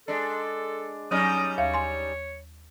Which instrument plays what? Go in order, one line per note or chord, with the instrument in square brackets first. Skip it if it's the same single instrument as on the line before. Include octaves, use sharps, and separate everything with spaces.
[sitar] G#3 D4 [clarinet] A4
[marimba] F#3 [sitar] G3 C#4 D#4 [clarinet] D#6
[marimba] D#2 F5 [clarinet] C#5
[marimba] G#5 C6